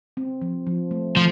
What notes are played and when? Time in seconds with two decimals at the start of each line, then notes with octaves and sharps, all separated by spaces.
0.17 C4
0.42 F3
0.67 F3
0.91 A3
1.16 F3 A3